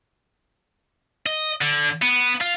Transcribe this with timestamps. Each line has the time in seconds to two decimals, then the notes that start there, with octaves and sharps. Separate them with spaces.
1.26 D#5
1.62 D3
2.02 B3
2.41 F4